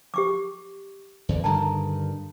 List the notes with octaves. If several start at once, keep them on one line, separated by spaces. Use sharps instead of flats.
G4 C#6 D6
E2 D3
G2 D3 D#3 A5 A#5